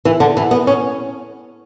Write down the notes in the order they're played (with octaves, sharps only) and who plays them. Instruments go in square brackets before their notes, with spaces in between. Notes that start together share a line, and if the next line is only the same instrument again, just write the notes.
[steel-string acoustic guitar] E3
D3
E3
B3
C#4